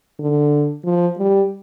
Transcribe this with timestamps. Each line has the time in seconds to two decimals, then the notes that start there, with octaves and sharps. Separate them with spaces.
0.20 D3
0.85 F3
1.19 G3